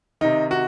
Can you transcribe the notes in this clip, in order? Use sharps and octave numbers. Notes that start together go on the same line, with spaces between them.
C3 D#3 D#4
F#4